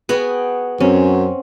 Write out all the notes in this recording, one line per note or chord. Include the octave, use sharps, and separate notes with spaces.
B3 F#4 G#4 G5
F#2 C4 C#4